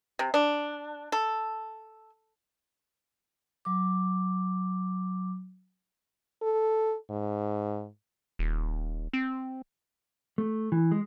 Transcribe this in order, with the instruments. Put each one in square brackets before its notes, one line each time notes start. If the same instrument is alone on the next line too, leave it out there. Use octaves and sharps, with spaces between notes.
[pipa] C3
D4
A4
[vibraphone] F#3 D6
[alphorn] A4
G#2
[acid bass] D#1
C4
[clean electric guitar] A3
E3
G#3